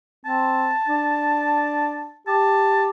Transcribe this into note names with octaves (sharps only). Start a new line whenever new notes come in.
C4 A5
D4
G4 A5